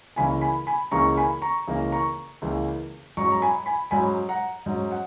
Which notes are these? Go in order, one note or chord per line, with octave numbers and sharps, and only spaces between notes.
C#2 C#3 E3 A#3 G#5 B5
G#5 B5
G#5 B5
C#2 C#3 E3 A#3 A#5 C#6
G#5 B5
A#5 C#6
C#2 C#3 E3 A#3
A#5 C#6
C#2 C#3 E3 A#3
G#2 F#3 C#4 A#5 C#6
A#5
G#5 B5
G#5 B5
G#2 F#3 C#4 G#5 B5
F#5 A#5
G#2 F#3 C#4
F#5